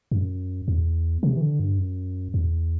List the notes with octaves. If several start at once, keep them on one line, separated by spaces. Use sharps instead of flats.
F#2
E2
C3
E3
D3
G2
F#2
E2